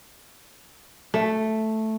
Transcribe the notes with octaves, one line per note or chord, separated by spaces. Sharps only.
A3